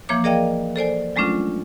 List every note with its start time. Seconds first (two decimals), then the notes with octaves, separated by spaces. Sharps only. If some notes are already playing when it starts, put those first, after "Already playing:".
0.09 E3 F3 A#3 C#5 D6
0.24 G#4 A#4 D5 D#5 F5 G5
0.76 A4 C5 D5 G#5
1.16 F#3 G#3 A3 C#4 D4 F4